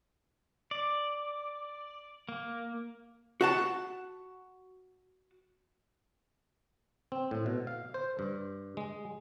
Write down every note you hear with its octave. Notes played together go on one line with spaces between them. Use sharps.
D5
A#3
F#4 F#5 A5
C4
A2
B2
F5
C5
G2
G#3